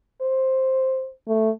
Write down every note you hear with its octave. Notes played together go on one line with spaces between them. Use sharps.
C5
A3